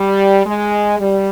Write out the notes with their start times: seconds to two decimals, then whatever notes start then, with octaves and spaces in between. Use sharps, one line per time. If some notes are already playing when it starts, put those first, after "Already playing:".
Already playing: G3
0.46 G#3
0.99 G3